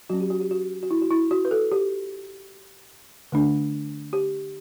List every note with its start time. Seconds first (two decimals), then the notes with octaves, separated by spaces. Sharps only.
0.10 F#3 C#4 F#4
0.21 G4
0.30 F#4
0.40 G4
0.51 F#4
0.83 F#4
0.91 E4
1.01 F#4
1.11 E4
1.31 F#4
1.45 B4
1.51 A4
1.72 G4
3.32 D3 A3 D4
4.13 G4